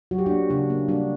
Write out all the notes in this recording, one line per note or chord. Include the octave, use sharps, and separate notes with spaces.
F#3 F#4
G4
A#3 D4 F#4
C#3 D4 F#4
A#3
G3 D4 F#4